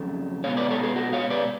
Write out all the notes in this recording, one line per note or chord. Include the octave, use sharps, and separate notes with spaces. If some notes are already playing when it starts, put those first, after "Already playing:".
Already playing: F2 C#3 F#3 A3
B2 G#3 B3 C#5 F5
B4 D5
A4 C#5
G#4 B4
F#4 A4
C#5 F5
B4 D5